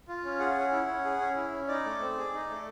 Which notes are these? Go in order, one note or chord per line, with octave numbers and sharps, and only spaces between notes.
F4
C#4
G#4 F#5
C#4
E4
C#4
G#4
C#4
E4
C#4
D#4 D5
A3
C4
G#4
D#4
A3